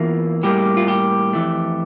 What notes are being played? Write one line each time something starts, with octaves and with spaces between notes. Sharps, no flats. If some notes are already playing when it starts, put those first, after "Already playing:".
Already playing: E2 E3 A#3 F4
A2 G3 A#3 G4
F4
G4
F2 E3 A3